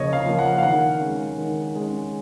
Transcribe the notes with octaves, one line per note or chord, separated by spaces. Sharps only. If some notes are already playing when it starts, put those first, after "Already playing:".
Already playing: C#3 F3 A#3 C#5 D#5
F5
F3 A#3
F#5
F5
D#3 F#5
G#3 C#4
D#3
G#3 C#4